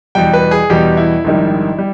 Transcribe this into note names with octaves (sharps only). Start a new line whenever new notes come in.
E2 B2 G3 G5
B4
G#4
E2 B2 G3 G4
E4
A#1 G#2 D#3 G3
G3